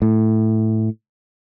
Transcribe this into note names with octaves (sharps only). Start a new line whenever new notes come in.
A2